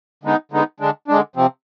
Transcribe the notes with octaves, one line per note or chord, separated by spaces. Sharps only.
D3 G#3 B3 D#4
D3 G#3 B3 D#4
D3 G#3 D4
D3 G#3 D4
C3 F3 C4